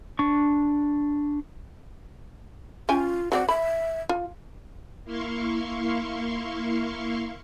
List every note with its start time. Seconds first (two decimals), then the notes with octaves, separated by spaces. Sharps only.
0.19 D4 C#6
2.89 C#4 F4 G5 G#5
3.32 F#3 C4 D5 F#5
3.49 E5 B5
4.09 F4
5.05 A#3 E4 F5 C6 C#6